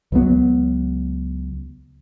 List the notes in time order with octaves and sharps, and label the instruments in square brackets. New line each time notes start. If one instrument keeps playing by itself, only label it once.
[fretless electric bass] C#2 F#3 B3